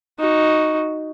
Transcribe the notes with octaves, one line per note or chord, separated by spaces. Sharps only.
D#4 F#4